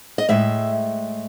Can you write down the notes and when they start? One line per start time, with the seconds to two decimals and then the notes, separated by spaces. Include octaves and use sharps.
0.18 D#5
0.29 A2 G#3 E5